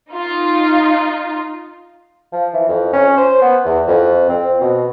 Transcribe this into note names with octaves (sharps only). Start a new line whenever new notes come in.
D#4 F4
F3
E3
F2
C#4
C5
B3
E2
F2
C4
B2